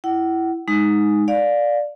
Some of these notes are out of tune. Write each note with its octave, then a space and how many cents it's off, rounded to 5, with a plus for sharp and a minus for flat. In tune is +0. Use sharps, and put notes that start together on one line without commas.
E4 +10 F#5 +35
G#3 +0 D#4 +0
D5 +0 F5 +20